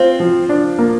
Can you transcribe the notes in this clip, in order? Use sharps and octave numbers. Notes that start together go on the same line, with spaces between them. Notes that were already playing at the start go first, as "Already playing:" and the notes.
Already playing: C4 F4
F3
D4
A#3